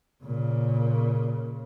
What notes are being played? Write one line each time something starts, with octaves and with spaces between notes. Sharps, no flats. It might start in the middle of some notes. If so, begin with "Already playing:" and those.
A#2 C#3